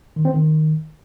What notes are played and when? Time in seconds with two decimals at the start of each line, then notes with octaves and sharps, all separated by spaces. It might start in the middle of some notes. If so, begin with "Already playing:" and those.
0.16 D#3
0.25 C4
0.34 D#3